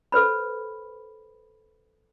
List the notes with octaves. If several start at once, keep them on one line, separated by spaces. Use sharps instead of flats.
A4 B4 C5 B5